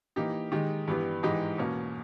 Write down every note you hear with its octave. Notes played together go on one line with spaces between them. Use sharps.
E3 A#3 D#4 G4
D#3 G#3 D#4 G4
G2 E3 G3 B3 G4
G#2 E3 G#3 D#4 G4
E2 B2 A#3 C#4